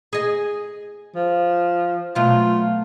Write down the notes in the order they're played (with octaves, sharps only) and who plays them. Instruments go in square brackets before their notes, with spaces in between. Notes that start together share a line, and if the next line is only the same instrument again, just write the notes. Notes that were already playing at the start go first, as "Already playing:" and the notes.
[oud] G#4 D#5
[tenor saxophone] F3
[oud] B2 F#3 A3 [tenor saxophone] F4